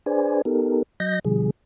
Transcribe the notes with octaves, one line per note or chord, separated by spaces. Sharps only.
D4 G#4 B4 C5 D5 G#5
B3 D#4 G4 A4 A#4
F#3 D#5 G6 A#6
B2 D3 F3 G3 G#4